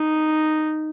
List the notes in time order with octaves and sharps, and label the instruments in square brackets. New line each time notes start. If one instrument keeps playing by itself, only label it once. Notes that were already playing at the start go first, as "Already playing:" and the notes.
Already playing: [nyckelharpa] D#4